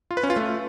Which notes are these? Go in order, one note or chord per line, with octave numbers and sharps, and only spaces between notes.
F4
B4
C#4
F4
A3